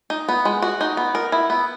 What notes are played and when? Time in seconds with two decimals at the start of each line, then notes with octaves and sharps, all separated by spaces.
0.10 D#4
0.28 B3
0.45 G#3
0.62 F#4
0.81 D#4
0.97 B3
1.15 A#4
1.32 E4
1.50 B3